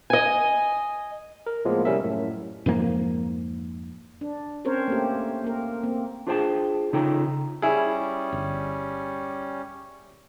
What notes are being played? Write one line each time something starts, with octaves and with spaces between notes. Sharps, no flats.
D#5 G#5
A#4
A2 F3 G#3 A#3 B3
C2 G3 C#4 A#4 E5
F#2 A2
F2 G#2 F3 A#3
D4
C4 C#4 A#4 C5 C#5
A3 A#3 G4
A#3 A#4
A#3 C4
D4 F4 G#4 C5 G5 A5
C#3 D#4 F4 A4 G5 A#5
G3 C#4 E4 G#4
G1